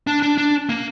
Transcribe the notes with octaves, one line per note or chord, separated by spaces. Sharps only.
D4
D4
D4
A#3